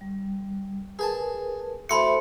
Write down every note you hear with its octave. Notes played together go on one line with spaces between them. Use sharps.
G3
G#4 A#4 B4 G#5 A5
A3 E4 F#4 A4 C5 B5 C6 C#7